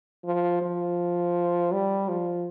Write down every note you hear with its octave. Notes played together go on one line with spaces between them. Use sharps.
F3
F3
G3
F3